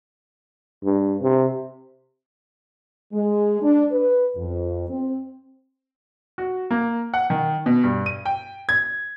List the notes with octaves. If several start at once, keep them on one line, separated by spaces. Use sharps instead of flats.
G2
C3
G#3
D4
B4
F2
C4
F#4
A#3
F#5
D#3
B2
G2
D#7
G5
G#6